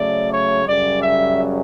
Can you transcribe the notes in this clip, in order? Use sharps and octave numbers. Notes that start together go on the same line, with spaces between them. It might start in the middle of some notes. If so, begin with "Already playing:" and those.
Already playing: C#3 F#3 A3 D5
C#5
F#2 C#3 G3 D5
E5